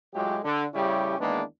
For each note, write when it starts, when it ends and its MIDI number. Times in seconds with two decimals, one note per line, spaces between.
0.14 0.38 45
0.14 0.38 54
0.14 0.38 56
0.14 0.38 65
0.14 0.38 67
0.44 0.66 50
0.74 1.17 45
0.74 1.17 49
0.74 1.17 55
0.74 1.17 61
0.74 1.17 64
0.74 1.17 67
1.19 1.42 40
1.19 1.42 51
1.19 1.42 56
1.19 1.42 58
1.19 1.42 59
1.19 1.42 62